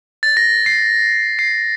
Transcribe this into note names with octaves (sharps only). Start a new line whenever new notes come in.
A6
A#6
C7
C7